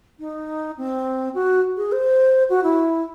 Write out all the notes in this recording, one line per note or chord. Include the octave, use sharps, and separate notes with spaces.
D#4
C4
F#4
G#4
C5
F#4
E4